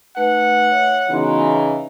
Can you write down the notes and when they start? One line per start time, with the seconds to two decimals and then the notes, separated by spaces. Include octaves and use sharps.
0.17 A3 D#4 B4 F#5
0.71 C#5 E5
1.10 C#3 E3 B3 D#4 F#4 C6
1.44 E5